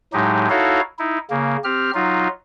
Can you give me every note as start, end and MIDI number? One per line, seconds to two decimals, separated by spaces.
0.13 0.48 45
0.13 0.48 54
0.13 0.48 56
0.13 0.48 63
0.13 0.48 67
0.50 0.81 63
0.50 0.81 64
0.50 0.81 66
0.50 0.81 69
0.50 0.81 73
0.50 0.81 77
0.99 1.19 63
0.99 1.19 64
1.30 1.57 49
1.30 1.57 58
1.64 1.91 60
1.64 1.91 67
1.64 1.91 89
1.94 2.28 54
1.94 2.28 63
1.94 2.28 65